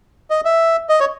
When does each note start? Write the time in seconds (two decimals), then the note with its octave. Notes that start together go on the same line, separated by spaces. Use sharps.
0.30 D#5
0.45 E5
0.89 D#5
1.00 C#5